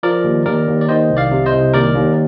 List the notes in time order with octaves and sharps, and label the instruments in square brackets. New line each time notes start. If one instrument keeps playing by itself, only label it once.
[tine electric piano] F3 A#4 D5
D#2
D#2 A#4 D5
D#2
D5
D#3 C5 D#5
C2
D5 F5
C3
C5 D#5
C2
D#2 A#4 D5
D#2